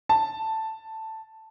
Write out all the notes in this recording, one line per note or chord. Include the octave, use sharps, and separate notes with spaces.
A5